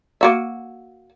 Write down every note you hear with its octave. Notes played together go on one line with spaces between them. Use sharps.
A#3 F#4 E5